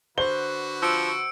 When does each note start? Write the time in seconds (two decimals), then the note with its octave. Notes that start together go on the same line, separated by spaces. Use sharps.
0.18 D3 F#4 B4 C5 G7
0.82 F3 E6 C#7 D7